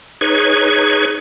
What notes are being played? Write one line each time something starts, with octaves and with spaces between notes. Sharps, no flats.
D#4 G#4 B4 C#5 C#6